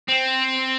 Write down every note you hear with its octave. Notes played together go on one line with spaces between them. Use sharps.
C4